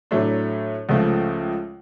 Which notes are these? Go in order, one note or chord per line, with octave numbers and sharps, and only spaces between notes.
A2 F#3 A3 D4
C#2 C#3 F3 A3